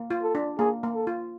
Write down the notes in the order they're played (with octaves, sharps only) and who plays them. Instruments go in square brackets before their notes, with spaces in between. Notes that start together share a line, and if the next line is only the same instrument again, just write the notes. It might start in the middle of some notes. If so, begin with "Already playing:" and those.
Already playing: [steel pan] A#3
F4
[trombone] A4
[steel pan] D4
[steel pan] A#3 [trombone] G#4
[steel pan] A#3
[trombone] A4
[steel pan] F4